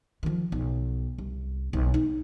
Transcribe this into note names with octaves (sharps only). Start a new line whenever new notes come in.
D#3 F3
B1
C2
B1
D#4